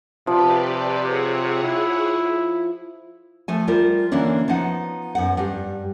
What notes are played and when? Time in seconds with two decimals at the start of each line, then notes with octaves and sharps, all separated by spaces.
0.27 C3 F3 G4 B4 D5
1.02 G#4 C#5 F#5
1.64 E4
3.48 F3 A3 G#5
3.67 G3 F4 A#4 C5
4.11 D3 E3 A#3 C#4 D4 E4
4.48 F3 B3 D#4 F#5
5.15 F#2 B3 F#5
5.37 G2 G3